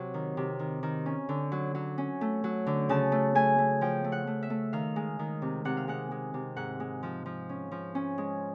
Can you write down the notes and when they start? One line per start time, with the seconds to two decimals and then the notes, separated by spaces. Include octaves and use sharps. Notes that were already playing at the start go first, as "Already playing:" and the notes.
Already playing: C3 F#3
0.14 D#3
0.37 C3
0.59 D#3
0.83 D#3
1.06 C#4
1.29 D3
1.52 F#3
1.75 F#3
1.98 C#4
2.21 A3
2.44 F#3
2.67 D3
2.89 C#3 A5
3.12 A3
3.35 A3 G#5
3.58 A3
3.81 F3 G5
4.04 A3
4.12 F#5
4.27 A3
4.43 E5
4.50 A3
4.73 D#3 F5
4.96 G#3
5.19 D#3
5.42 C3
5.65 C3 F#5
5.77 F5
5.88 G#3 F#5
6.11 G#3
6.34 C3
6.56 G#2 F#5
6.80 G#3
7.03 F3
7.26 F3
7.49 C#4
7.71 F3
7.95 C#4
8.18 G#3